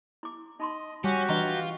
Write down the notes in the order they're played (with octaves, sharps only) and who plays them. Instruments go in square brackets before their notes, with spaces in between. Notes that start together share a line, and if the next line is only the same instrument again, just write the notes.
[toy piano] E4 D6
[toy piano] D#4 B5 C6 [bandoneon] D#5
[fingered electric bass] G3 [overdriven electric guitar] C#4 [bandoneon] F#4 G4
[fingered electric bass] E3 D4 [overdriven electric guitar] F4 [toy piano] B4 D#5 A#5